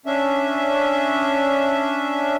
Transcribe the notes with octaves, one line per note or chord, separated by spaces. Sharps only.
C#4 D4 E5